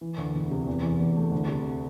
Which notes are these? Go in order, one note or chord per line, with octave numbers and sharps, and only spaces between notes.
E3
D2
E1
C3
E2
E3
E2
A3
D2
C3